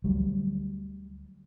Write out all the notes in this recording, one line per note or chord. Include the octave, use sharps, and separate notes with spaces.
D2 F#3 G3